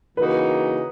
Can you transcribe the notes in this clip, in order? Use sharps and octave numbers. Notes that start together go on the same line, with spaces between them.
C#3 E3 A#3 D#4 F#4 B4